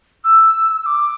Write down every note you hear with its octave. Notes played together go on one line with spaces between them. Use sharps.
E6
E6
D6